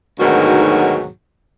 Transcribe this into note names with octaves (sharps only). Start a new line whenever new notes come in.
D2 G#2 B2 D#3 F#3 F#4